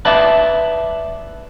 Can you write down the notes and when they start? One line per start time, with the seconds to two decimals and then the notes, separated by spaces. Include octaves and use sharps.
0.05 B4 D5 E5 A5